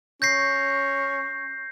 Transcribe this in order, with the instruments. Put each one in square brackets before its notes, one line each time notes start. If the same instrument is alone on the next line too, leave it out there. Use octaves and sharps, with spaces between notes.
[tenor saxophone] C#4 [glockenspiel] G6 A#6 C7